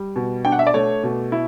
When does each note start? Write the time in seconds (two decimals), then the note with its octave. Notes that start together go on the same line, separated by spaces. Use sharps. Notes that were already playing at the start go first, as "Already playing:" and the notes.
Already playing: G3
0.16 B2
0.45 D4 G5
0.52 F#5
0.59 E5
0.67 D5
0.74 A3 C#5
1.03 B2
1.32 E4